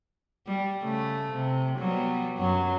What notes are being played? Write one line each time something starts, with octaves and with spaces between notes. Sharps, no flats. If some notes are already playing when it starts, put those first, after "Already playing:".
G3
C#3 A3
C3
F#3 G3 B3
F#2 F#3